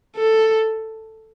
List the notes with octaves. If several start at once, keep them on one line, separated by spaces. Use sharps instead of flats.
A4